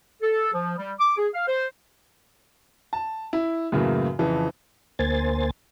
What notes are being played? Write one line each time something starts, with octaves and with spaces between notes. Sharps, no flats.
A4
F3
G3
D6
G#4
F5
C5
A5
E4
F#2 A2 C#3 E3 A#3
F2 C#3 E3 F3
D2 A#3 C5 G#5 A6